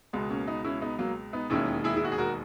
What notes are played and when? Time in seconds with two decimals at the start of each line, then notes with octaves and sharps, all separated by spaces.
0.13 C#2 B2 G#3 B3
0.30 A#3 C#4
0.47 B3 D#4
0.64 C#4 E4
0.81 B3 D#4
0.99 F#3 A#3
1.33 B3 D#4
1.50 E1 D#2 D#3 C#4 E4
1.84 E4 G#4
1.97 E4
2.04 F#4
2.12 G#4
2.18 F#4 A#4